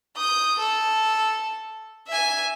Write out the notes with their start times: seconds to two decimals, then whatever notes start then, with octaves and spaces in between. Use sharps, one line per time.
0.17 D#6 G6
0.59 A4
2.08 E5 G#5